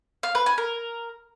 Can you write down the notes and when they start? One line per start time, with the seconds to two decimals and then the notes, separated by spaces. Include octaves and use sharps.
0.23 F5
0.35 B4
0.46 G#5
0.58 A#4